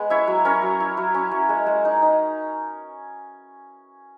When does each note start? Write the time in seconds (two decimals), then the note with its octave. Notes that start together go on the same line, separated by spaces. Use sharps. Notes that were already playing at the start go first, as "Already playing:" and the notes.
Already playing: G#3 B3
0.10 E4 C#5 E5
0.28 F#3
0.45 C#4 A#4 C#5
0.62 F#3
0.80 E4
0.97 F#3
1.14 C#4
1.31 F#3
1.49 G#3
1.66 G#3
1.85 D#4
2.02 D#4